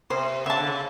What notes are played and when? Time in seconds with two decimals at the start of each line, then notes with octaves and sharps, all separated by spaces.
0.10 C3 C5
0.46 C#3 E5 A5
0.57 D3
0.67 C#3